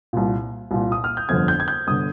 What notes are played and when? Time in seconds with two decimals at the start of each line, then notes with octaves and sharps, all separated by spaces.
0.13 C2 A#2
0.71 C2 A#2
0.92 D#6
1.04 F6
1.17 G6
1.29 G1 F2 D3 G#6
1.48 G6
1.60 G#6
1.68 G6
1.87 G1 D3 D#6